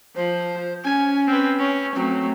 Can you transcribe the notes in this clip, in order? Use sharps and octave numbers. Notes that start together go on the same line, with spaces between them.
F3 C5
C#4 G#5
C4 B4
C#4
F#3 A3 C4